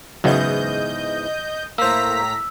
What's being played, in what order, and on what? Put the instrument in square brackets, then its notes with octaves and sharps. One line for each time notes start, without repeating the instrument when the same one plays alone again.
[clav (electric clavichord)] E2 G#2 E3 [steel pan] C#3 F#3 [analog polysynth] D#5 G6
[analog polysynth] A2 A#5 B6 [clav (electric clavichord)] A#3 C5 [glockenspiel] E6